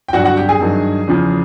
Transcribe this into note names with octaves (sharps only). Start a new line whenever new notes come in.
G5
G2 D3 F#3 F#4 F#5
F#4 F#5
G4 G5
G#4 G#5
G2 D#3 F#3
E2 C#3 F3